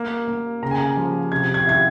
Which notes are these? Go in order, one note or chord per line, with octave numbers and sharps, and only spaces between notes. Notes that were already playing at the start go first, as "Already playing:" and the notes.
Already playing: A#3
A#3
C#3 A#5
G#5
A#5
F3
C3 G#6
G#6
E4 G#6